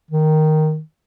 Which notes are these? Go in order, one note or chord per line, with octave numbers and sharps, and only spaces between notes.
D#3